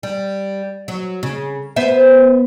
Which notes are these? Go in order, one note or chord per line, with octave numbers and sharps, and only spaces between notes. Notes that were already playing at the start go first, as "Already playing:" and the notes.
G3
F#3
C#3
B3 C5 E5